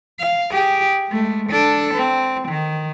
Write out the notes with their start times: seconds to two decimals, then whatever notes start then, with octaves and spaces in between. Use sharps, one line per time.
0.19 F5
0.52 G4 G#4
1.08 G#3 A3
1.49 D4 A4
1.94 C4
2.48 D#3